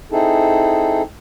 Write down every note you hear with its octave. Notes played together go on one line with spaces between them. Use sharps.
C4 D#4 E4 G#4 A4